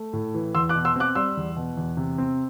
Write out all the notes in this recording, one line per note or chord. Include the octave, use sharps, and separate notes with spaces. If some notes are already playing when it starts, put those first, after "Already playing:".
Already playing: A3
A2
E3
E2 C6 E6
D6 F#6
B2
C6 E6
C4 D6 F#6
G3 C6 E6
E2
B2
E2
C3
C4